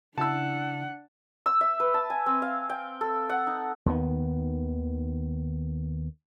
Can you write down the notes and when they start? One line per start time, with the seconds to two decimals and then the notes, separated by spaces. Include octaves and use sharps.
0.18 C#3 D4 E4 F#5 A5 E6
1.46 E6
1.61 E5
1.80 B4
1.94 A5
2.10 G#5
2.26 C4
2.42 F5
2.69 G5
3.01 A4
3.29 F#5
3.47 D#4
3.86 D#2 D#3 B3